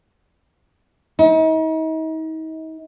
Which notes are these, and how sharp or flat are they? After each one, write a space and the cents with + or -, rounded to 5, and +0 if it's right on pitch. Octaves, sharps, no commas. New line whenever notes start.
D#4 +40